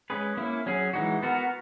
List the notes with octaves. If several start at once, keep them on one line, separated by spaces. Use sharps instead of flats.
G#3 C#4 G#4 B4
A#3 C#4 E4
F#3 C#4 G#4
E3 G#3 D#4 F#4
B3 F#4 A#4